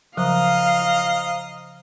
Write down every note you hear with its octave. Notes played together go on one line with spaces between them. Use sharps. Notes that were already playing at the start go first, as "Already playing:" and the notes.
C#3 F3 F#3 C5 D#5 F5 A#5